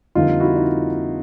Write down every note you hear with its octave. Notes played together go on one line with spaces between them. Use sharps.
F2 D3 G3 A#3 D#4 F4
E4 F#4
D#4